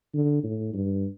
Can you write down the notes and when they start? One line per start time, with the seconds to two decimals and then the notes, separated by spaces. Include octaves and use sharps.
0.14 D3
0.44 A2
0.74 G2